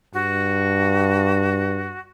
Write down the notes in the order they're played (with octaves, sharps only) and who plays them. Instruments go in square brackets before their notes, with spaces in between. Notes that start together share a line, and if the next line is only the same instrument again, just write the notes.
[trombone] G2 [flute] F#4